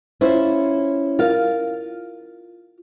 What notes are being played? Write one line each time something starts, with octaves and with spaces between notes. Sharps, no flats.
C#4 E4 F4 C5
F4 A#4 F5